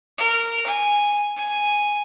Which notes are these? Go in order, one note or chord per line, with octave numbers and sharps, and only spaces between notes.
A#4
G#5
G#5